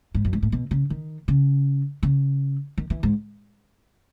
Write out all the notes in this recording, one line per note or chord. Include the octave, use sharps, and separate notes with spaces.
G#2
F#2
G#2
A2
B2
C#3
D#3
C#3
C#3
D#3
E3
G#2